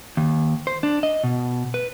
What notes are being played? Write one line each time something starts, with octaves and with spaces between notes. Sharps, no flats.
D#2
C5
D4
D#5
B2
B4